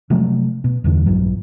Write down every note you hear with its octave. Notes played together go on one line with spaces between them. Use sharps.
C3 F3 F#3 A3
B2
E2 G2 D3
A#1 G2 F#3